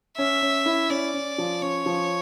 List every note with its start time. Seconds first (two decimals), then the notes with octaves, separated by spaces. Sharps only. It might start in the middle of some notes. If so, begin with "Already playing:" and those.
0.18 C#4 E5
0.42 C#4
0.66 E4
0.90 C#4 D5
1.14 C#4
1.38 F3
1.62 C#4 C#5
1.86 F3